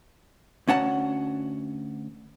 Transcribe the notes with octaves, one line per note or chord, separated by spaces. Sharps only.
D2 C#4 F#5 A5